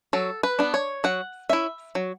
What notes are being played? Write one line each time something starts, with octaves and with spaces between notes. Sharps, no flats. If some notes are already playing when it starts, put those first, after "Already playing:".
F#3 A4
B4
B3 D4
C#5
F#3 F#5
C#4 E4 E5
F#3